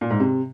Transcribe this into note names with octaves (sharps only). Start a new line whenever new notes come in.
A#2
G#2
C3